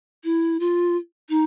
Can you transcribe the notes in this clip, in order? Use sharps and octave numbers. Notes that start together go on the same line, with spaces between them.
E4
F4
D#4